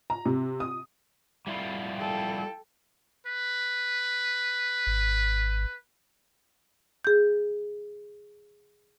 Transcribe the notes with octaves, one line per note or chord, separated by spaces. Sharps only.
A#5
C3
D#6
G3 E4 F4
A4 G5
B4
G#1
G#4 G6